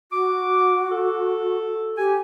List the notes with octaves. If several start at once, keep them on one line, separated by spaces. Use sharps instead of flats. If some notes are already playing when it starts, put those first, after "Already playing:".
F#4 D6
A4
G4 G#5